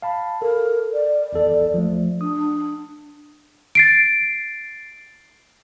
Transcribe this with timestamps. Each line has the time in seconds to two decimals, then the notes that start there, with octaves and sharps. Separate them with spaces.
0.02 F5 A5 B5
0.42 A4 A#4
0.94 D5
1.32 G#1 E2 A4
1.74 F3 A3
2.21 D4 D#6
3.75 A6 C7 D7